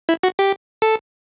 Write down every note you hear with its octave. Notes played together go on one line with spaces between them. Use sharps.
E4
F#4
G4
A4